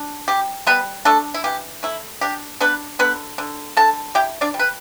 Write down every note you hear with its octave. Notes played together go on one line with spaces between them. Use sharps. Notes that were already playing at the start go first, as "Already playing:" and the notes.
Already playing: D4
G3 G4
G3 B3 B4
A3 D4 A4
E4
E3 G4
A3 E4
D4 G4
B3 D4 B4
D3 B3 B4
D3
D3 A4 A5
E4 G4 G5
D4 D5
G3
B4